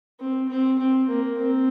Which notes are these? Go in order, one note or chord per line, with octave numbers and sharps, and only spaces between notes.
C4
C4
C4
A#3
C4